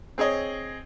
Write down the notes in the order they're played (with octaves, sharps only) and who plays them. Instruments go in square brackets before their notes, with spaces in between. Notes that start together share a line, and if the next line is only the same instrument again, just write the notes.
[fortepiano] C4 G#4 C#5 D#5